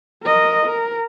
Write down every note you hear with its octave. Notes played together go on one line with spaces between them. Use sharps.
A#4 D#5
A#4